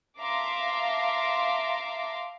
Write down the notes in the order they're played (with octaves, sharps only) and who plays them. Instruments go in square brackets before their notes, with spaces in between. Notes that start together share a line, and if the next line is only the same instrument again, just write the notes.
[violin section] E5 F5 A5 A#5 C6 D6